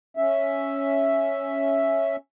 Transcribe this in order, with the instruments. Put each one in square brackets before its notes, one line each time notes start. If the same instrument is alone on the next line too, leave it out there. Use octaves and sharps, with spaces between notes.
[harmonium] C#4 E5